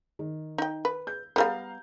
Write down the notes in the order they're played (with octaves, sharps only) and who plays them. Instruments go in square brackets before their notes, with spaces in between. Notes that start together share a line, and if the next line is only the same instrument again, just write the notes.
[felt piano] D#3
[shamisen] D#4 G5
B4
[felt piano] G6
[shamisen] G3 A#3 B3 [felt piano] F5 A#5 G6